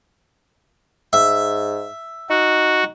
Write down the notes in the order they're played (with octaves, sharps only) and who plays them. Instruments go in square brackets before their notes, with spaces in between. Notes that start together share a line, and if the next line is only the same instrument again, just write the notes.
[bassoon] G#2 [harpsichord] E5
[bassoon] D#4 [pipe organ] F#4